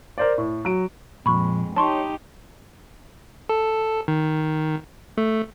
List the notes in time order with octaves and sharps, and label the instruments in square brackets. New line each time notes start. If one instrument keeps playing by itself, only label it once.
[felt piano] A#4 C5 D5
A2
F#3 D7
[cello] F2 G#3 [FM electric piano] A#2 F3 [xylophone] B5 C#6
[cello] D#4 G4 [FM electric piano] C#5 [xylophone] A5 C6 C#6
[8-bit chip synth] A4
D#3
A3